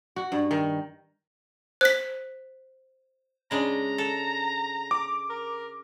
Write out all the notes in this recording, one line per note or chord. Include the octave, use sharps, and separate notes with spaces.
F#4
G2
D#3
C5 F#6 B6
C#3 G#3 D4 A#5
A4
D6
A#4